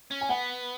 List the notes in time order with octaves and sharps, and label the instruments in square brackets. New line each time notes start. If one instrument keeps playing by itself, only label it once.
[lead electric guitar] C#4
[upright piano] G#5
[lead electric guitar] B3 [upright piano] F#5